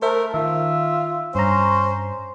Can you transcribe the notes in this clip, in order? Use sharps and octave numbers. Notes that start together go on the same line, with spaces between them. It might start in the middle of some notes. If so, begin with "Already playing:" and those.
A3 A#4 C5 E5
D#3 F4 E5
G2 C#4 C5 A#5